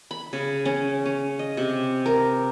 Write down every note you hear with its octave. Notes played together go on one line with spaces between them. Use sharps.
B5
C#3
C#4
C#4
D#5
C3
A#4